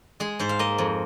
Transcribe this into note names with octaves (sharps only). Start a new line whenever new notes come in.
G#3 G#4
G#2 C5
F5
A#3 D#5
F2